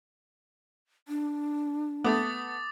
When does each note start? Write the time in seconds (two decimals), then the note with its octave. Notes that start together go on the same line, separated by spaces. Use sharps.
1.08 D4
2.04 A3 B3 D6 D#6 A6